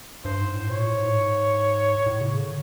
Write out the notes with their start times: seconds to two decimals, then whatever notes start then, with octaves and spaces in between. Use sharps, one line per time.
0.25 G2 C5
0.40 G#2
0.55 A2
0.70 A#2 C#5
0.85 A2
1.00 G#2
2.06 A2
2.21 C#3
2.37 D3